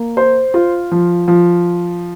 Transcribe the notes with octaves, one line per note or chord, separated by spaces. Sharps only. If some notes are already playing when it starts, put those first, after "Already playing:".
Already playing: A#3
C5
F4
F3
F3